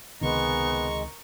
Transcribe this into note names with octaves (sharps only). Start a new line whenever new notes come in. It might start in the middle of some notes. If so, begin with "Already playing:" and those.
C#2 C3 D#3 G#3 B3 A#4 C#6